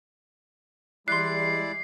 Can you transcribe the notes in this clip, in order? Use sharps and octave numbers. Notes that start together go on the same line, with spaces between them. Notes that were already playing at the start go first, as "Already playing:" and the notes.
E3 G3 G#3 E4 D5 C6 F#6 C7